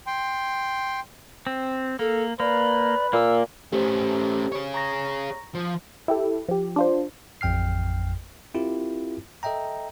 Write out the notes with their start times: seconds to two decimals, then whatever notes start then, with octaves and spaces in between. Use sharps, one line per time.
0.07 G5 C6
1.47 C4
1.99 A#3 A4
2.40 A#3 B4 D5
3.13 A#2 A#3 E6
3.72 A3 C#4 G4 C5
4.52 G#4 C#5
4.74 A#5 C#6 A#6
5.54 F3
6.08 E4 G4 A4
6.49 F3 G4
6.76 D4 F4 C5
7.41 A1 F2 G5 F6 C7
8.54 C4 E4 F4 G4 A#4
9.43 A4 D#5 E5 G5 A#5